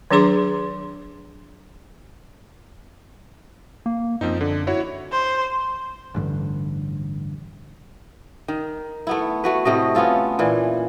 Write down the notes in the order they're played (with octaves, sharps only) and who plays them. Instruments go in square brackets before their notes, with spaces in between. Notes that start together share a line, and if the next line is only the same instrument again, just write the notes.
[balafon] D#3 F#3 D4 G#4 C6 D6
[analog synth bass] A#3
[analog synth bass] F#2 [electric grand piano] F3 C4 D#4
[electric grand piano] D3
E4 F#4 C#5
[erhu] C5
[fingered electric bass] A1 G2 D3
[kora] D#3
A3 B3 E4
A3 F#4 B4
A2 C3 A3 D#5
B3 C#4 F4 A4
A#2 E3